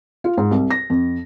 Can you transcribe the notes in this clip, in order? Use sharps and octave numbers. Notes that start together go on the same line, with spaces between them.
F4
G#2
C2
A#6
F2